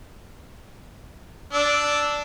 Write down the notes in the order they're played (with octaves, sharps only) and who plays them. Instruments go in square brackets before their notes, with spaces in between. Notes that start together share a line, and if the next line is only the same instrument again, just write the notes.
[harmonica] D4 E6